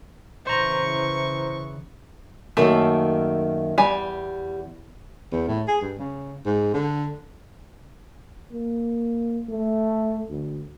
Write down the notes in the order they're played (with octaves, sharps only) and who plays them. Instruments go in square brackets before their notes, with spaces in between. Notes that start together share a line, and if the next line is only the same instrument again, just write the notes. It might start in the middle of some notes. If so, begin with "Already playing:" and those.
[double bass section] C#3 E3 [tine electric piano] C5 A#5 [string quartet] C#6
[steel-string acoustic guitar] F#2 D#3 A#3 [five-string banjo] A3
[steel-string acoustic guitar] E2 [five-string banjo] G3 G#5
[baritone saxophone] E2
A2
G#4
G2
C#3
G#2
D3
[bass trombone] A#3
A3
D2